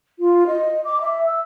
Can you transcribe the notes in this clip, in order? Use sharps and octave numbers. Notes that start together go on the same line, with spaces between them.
F4
D#5
D6
E5
E6